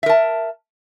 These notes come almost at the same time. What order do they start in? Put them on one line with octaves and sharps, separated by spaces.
E5 A#4 A5